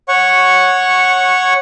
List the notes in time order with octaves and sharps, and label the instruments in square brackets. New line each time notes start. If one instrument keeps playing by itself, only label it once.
[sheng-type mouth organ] C#5 F#5 C#6